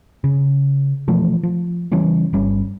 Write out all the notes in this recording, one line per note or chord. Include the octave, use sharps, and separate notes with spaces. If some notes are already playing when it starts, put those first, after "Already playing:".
C#3
B2 E3 F3 A3
F3
C#3 E3 G3 C#4
G1 G3 C#4